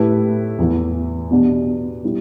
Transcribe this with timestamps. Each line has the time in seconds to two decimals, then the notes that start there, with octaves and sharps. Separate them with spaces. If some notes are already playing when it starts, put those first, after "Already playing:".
Already playing: A2 A3 E4 G4 B4
0.58 E2 E3 B3
1.31 B2 B3 D4 G4
2.03 B2 G3 E4